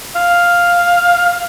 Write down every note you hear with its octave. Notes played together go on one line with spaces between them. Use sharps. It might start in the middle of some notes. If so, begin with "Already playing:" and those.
F5